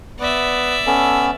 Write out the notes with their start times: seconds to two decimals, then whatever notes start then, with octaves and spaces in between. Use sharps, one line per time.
0.20 B3 D5 E5
0.87 B3 C#4 A4